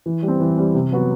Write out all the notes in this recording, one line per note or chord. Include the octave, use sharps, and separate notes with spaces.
E3
G3
C4
E3
G3 C4
C3
F#3 B3 F#4